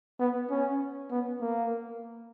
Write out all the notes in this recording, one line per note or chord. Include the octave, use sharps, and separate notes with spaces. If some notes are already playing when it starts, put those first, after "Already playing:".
B3
C#4
B3
A#3